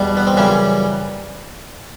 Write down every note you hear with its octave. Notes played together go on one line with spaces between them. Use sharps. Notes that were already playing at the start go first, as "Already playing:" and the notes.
Already playing: E2 B2 G3
B3
C4
F#2 C#3 E3 G3 C#4